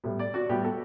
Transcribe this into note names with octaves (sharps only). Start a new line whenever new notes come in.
A2 G3 B3
D5
F#4
A2 G3 B3 G4
A4